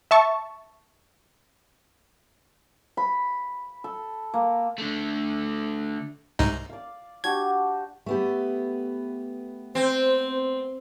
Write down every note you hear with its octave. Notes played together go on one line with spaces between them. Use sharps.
E5 A5 C#6
B5
A4
A#3
D3 A3
C2 G#2 D#4
D5 F5
D4 F#4 G4 G#6
A3 B3 G4
C4 C5